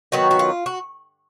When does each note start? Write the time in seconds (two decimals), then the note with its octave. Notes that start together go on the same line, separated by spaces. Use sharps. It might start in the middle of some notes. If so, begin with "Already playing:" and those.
0.12 D#3 F#3 B3 F#4
0.31 F#4
0.39 F4
0.66 F#4